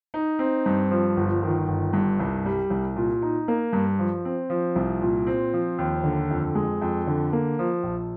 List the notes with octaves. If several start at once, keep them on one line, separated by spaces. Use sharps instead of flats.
D#4
C4
G2
F3
G1
D#3
G1
G2
C2
G3
C2
A#2
D#4
A#3
G2
F3
C4
F3
C2
A#2
C4
F3
D#2
D3
F2
G#3
F2
D3
A#3
F3
A#1